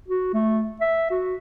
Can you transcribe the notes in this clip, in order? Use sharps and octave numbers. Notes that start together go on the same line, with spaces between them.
F#4
A3
E5
F#4